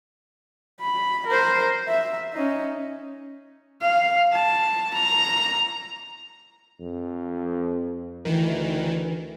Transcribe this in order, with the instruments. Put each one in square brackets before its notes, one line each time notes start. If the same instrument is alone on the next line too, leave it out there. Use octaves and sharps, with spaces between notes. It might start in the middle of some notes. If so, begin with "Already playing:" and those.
[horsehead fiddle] B5
A#4 C5
E5
C#4 D#4
F5
A5
A#5
[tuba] F2
[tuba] D2 [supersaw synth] D#3 E3